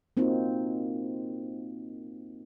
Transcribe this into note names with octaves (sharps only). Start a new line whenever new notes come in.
A#3 C4 D#4 F4 F#4